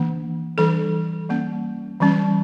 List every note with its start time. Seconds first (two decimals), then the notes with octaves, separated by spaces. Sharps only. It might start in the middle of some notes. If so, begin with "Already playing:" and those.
Already playing: E3 A#3 D4
0.58 E3 G3 D4 A4
1.30 G3 A#3 C#4
2.00 E3 G3 C#4